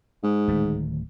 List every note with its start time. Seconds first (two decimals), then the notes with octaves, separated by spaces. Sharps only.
0.23 G#2
0.48 D1 D#3 A3